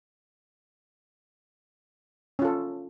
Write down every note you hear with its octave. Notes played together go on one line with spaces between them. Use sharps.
C#4 F4 A4